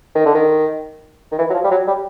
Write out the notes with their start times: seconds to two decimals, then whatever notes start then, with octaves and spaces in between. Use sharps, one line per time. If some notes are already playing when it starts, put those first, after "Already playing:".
0.15 D#3
0.26 D3
0.35 D#3
1.32 D#3
1.39 E3
1.50 F#3
1.54 F3
1.64 G3
1.71 F#3
1.88 G3